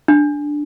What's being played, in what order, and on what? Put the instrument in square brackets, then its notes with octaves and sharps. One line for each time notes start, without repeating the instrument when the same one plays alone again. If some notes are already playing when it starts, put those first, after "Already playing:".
[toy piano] D4